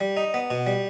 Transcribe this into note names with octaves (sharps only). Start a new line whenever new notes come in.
G3
D#4
B3
B2
G3